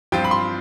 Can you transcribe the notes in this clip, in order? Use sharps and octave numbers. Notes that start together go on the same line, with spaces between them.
G2 F3 C4 F4 G5
B5
C6